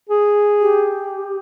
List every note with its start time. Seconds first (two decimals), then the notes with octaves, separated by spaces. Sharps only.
0.09 G#4
0.61 G4